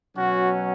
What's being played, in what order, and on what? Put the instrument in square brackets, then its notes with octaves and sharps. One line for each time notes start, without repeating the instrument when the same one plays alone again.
[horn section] B2 F#3 C#4 F#4